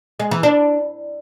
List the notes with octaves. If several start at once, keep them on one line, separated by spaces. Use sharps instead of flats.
G#3
E3
D4